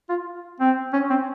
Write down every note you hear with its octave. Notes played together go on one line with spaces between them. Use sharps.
F4
C4
C#4
C4